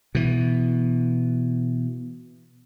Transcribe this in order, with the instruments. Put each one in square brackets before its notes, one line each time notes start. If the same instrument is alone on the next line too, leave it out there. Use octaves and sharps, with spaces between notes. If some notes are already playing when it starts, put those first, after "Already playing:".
[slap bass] B2 E3